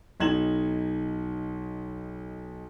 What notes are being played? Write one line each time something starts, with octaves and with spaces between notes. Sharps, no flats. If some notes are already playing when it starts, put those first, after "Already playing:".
B1 D#4 G#6 E7 F#7